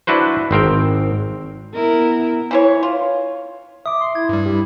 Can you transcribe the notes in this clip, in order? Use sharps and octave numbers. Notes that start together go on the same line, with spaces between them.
D4 E4 F#4 B4 C5
G#1 C4 A#4 G5
B3 E4 A#4
E3 E4 C#5
F4
E5 D6 D#6
C6
E4 G#6
G2 G3
E4 G4